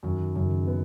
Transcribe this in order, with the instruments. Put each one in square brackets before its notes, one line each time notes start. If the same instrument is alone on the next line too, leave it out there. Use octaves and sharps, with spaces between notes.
[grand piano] F#2 [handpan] D#3
[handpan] D#3
[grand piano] F#2 [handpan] C#3
[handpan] D#3
[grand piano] B3